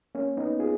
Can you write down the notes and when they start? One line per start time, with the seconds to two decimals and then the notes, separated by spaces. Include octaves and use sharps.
0.15 A#3 C#4
0.37 B3 D#4
0.59 F4 G#4